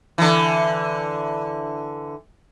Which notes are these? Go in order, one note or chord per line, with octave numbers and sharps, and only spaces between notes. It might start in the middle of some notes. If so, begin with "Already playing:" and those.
D3 E3